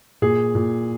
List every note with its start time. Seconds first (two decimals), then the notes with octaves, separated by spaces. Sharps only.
0.22 A#2 G#4
0.55 A#2